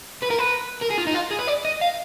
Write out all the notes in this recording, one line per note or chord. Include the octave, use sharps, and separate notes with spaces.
B4
A#4
B4
A#4
G#4
F4
D#4
F4
G#4
B4
D5
D#5
F5